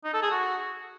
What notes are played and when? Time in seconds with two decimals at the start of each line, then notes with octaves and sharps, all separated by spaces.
0.05 D#4
0.14 A4
0.22 G#4
0.31 F#4